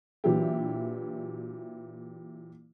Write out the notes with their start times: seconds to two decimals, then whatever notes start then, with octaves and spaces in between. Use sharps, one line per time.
0.24 A#2 E3 F#3 D4 E4 G4